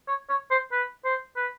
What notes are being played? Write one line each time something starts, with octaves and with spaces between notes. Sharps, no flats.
C#5
C#5
C5
B4
C5
B4